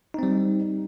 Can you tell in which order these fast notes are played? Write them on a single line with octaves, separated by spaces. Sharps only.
D#4 C4 G3